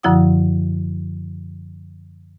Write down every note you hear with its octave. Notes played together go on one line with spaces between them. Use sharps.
F#2 D3 F3 E4 F#5 D#6